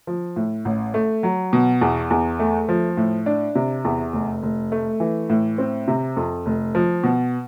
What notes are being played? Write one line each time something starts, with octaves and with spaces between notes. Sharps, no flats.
F3
A2
A1
A3
F#3
B2
E2
E2
A3
F3
A2
D4
C3
E2
F1
F1
A3
E3
A2
C4
C3
F2
F1
F3
B2